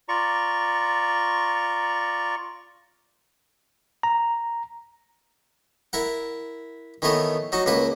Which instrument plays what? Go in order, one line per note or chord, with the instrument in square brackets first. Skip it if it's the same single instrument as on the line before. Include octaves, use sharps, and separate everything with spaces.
[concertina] F4 D5 A#5 C#6
[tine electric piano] A#5
[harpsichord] E4 A#4 F#5
D#3 E3 A3 B3 C#5 D#5
F#3 D#4 F#4
C#2 A#3 B4 F#5